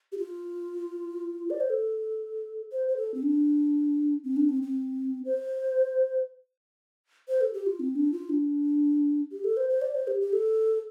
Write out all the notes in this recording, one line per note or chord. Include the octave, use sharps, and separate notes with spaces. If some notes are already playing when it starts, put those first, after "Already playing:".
G4
F4
D5
C5
A4
C5
C5
A4
C4
D4
C4
D4
C4
C4
C5
C5
A4
G4
F4
C4
D4
F4
D4
G4
A4
C5
C5
D5
C5
G4
G4
A4